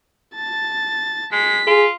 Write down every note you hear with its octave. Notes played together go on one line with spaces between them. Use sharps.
A5 A6
G#3 B6
F4 G#4